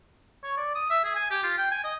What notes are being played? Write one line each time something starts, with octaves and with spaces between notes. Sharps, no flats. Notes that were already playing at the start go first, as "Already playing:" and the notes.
C#5
D5
D#6
E5
G#4
G#5
G4
F4
G5
G#5
D#5